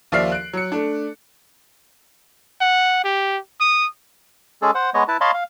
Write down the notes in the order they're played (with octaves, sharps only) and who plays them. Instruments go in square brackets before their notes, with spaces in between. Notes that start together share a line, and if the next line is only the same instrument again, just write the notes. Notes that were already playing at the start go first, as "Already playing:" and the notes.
[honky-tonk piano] D#2 F3 D5 E5 F6 C7
F#6 D7
F#3 C#7
A3 D4
[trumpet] F#5
G4
D#6
[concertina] G#3 C#4 G#4 A4
C5 F#5
G#3 B3 C#5 D#5
E4 B4 A5
C#5 D#5 F5 A5 B5 C6
F5